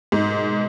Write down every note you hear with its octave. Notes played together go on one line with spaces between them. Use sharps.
G#2 B2 G#3 D#4 F#4 A#4